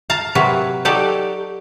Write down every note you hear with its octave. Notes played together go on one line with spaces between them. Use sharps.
F5 A5 A#5
C3 F#3 A#3 F#4 B4
F#3 D#4 G4 A4 D5